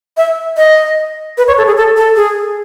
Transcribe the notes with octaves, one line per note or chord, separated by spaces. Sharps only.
E5
D#5
B4
C#5
A4
G#4
A4
A4
G#4